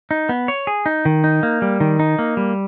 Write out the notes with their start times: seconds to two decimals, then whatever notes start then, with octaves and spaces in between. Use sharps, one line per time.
0.11 D#4
0.29 B3
0.48 C#5
0.67 G#4
0.86 D#4
1.05 D#3
1.24 D#4
1.43 A#3
1.62 G3
1.80 D#3
1.99 D#4
2.19 A#3
2.37 G3